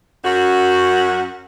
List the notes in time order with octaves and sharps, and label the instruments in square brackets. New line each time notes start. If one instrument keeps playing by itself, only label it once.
[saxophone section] F#2 F#4